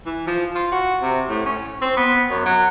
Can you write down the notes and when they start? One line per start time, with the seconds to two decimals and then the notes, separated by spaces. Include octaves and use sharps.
0.06 E3
0.27 F3
0.55 F4
0.72 F#4
1.02 C3
1.29 A2
1.46 C#4
1.81 C4
1.97 B3
2.30 F#2
2.46 F#3